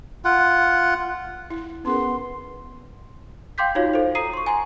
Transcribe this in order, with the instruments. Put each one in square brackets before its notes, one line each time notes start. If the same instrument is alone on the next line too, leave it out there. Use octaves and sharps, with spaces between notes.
[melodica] F4 F#5
[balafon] E4
[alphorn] B3 [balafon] C#4 G#4 A#4 [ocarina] C6
[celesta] F5 G5 C6 D6 G6 B6
D#4 F4 F#4 C#5 F5
A4 C5
A#5 D#6 C7 D#7
C6 C#6
G#5 A#5 C6